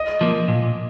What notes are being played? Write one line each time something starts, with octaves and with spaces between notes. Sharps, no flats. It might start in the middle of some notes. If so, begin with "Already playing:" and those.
Already playing: D#5
F3 A#3
A#2